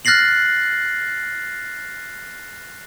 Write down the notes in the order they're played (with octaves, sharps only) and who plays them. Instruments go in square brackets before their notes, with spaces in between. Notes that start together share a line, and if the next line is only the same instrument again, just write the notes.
[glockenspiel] F6 F#6 A6 A#6 C7 F#7